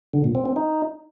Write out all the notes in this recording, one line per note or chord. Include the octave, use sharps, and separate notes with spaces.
D3
A#2
C4
C4
D#4